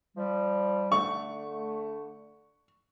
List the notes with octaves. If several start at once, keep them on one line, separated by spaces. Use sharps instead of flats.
F3 G3
D3 A3 C#6